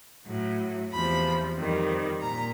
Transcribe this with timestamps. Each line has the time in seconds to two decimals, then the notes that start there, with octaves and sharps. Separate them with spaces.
0.26 A2 F#3
0.90 E2 C3 F3 B5
1.56 F2 C3 D#3 G3
2.21 A#2 A#5